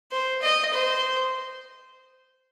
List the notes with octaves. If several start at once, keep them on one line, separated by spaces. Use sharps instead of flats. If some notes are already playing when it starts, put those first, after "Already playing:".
C5
D#5
C5